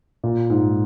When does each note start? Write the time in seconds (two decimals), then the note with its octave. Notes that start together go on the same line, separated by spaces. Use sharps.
0.24 A#2
0.50 G#2